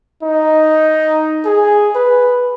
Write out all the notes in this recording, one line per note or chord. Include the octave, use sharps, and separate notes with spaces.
D#4
G#4
B4